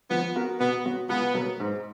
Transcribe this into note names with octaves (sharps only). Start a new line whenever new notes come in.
F3 B3
B3 F#4 A#4
B2 B3
F#3 B3 F#4
C#2 B3
B2 F#3 A#3
G#2